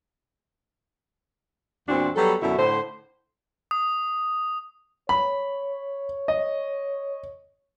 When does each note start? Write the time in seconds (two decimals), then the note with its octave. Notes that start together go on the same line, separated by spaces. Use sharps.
1.88 E2 A#2 C4 D4 F#4
2.16 F#3 G3 B3 A4
2.41 F#2 B2 D3 E4 F#4
2.58 A2 D3 C5
3.71 D#6
5.09 C#5 B5
6.28 D#5